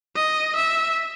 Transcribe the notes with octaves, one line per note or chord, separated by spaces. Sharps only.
D#5
E5